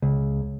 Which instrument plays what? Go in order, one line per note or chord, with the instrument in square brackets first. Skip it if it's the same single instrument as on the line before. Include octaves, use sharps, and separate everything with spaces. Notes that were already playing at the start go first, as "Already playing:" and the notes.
[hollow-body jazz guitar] C#2